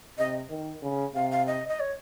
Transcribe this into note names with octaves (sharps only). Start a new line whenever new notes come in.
C3 D#5
D#3
C#3
C3 F5
F5
D#5
D#5
C#5